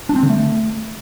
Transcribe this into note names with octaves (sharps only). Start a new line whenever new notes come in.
D4
C4
D3
A3